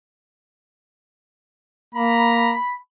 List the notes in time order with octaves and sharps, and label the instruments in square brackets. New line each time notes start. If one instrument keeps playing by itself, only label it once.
[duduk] A#3 [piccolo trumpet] A#5 [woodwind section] B5